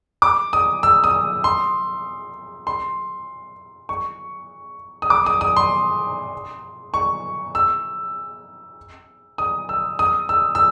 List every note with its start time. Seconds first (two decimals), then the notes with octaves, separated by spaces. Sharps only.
0.22 D6
0.53 D#6
0.83 E6
1.04 D#6
1.44 C6
2.67 C6
3.89 C#6
5.02 D#6
5.10 D6
5.26 D#6
5.41 D#6
5.56 C6
6.94 C#6
7.55 E6
9.38 D#6
9.69 E6
9.99 D#6
10.29 E6
10.55 E6